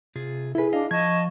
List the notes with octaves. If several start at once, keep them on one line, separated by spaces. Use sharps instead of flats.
C3 F4 G#4
E4 G#4 A4 B4
D4 D#5 F5
F3 D#5 A5 C#6 G#6